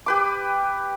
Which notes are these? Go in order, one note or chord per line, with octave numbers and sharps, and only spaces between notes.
G4 B4 D6